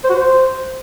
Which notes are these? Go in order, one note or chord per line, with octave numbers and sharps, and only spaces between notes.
C5
F#4
C5